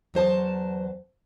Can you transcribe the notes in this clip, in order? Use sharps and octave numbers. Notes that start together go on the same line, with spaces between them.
E2 F#3 C5 A5